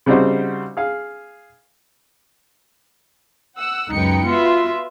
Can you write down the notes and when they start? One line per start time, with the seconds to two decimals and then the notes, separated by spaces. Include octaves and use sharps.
0.06 C#3 G3 C4 D#4 F#4 C5
0.77 G#4 F5
3.57 F#5 E6
3.91 C#2 F#2 D#4 B4 G5 C#7
4.26 B3 F4 F#4 B4 E5